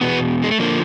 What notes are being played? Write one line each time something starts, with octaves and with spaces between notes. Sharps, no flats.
E2 B2 B3
G#3
A3
D3 F3 A#3